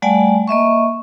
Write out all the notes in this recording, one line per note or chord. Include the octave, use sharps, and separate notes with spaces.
G3 A3 D5 F#5 G#5 A5
A#3 D#5 E5 C#6